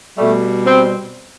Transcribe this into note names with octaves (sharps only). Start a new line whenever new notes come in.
B2 G3 A3
C4